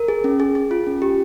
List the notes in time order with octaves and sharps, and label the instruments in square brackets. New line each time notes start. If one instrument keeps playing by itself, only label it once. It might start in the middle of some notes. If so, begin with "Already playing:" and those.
Already playing: [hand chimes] A#4
G#4
C#4
G#4
G#4
F4
C#4
G4